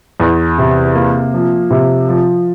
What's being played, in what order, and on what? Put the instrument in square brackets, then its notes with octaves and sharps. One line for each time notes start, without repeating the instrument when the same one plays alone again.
[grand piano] E2
C3
A#3
F3
C3
F3